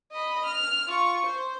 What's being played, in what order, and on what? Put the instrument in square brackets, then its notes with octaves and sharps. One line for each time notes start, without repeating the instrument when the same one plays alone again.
[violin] D#5 B5
F6
F4 C#6
C5